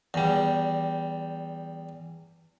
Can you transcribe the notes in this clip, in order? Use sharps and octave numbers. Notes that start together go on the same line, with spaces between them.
E2 G3